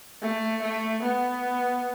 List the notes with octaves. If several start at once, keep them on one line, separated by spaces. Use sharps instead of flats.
A3
A3
B3